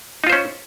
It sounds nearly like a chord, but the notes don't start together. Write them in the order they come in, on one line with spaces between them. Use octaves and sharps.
D#4 F4 C5 C#4